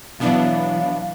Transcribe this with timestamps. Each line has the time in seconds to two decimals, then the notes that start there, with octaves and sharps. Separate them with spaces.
0.20 B2 E3 F#3 B3 D4 F5